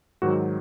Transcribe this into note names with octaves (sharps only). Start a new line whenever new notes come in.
G#2 D#3 F#3 F#4